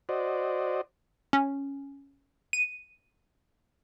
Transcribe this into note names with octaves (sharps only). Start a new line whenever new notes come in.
F#4 C5 D5 D#5
C#4
D#7